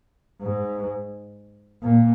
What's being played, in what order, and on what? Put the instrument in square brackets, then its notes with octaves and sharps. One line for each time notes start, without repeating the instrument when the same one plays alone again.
[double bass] G#2
A#2